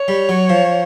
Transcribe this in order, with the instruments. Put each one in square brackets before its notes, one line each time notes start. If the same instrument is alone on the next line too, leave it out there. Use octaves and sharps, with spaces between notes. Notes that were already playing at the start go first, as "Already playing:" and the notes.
Already playing: [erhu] C#5
[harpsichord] G3
F#3
F3